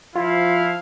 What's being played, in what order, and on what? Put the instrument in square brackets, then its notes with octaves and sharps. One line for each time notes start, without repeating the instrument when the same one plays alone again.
[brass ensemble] F3 F5 [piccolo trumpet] E4 [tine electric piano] F4